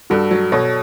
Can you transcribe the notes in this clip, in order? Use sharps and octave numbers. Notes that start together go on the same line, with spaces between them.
G2 F#4 A4
F#3
B2 A4 C#5